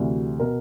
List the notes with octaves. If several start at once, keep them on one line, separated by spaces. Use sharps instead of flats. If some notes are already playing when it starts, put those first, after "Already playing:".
Already playing: D2 C3 E3 F#4
B2 A#4